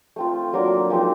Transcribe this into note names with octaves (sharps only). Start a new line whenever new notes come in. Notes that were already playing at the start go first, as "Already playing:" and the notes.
A3 C4 F4
F#3 A#3 D4 F4 A#4
F3 G#3 C4 D#4